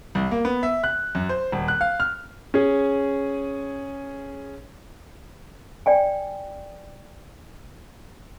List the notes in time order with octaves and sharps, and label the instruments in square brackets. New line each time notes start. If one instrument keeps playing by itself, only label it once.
[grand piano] C2
A#3
B3
E5
F#6
F#2
C5
D#1
F#6
F5
F6
[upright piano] C#4 G#4
[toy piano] D5 G5 G#5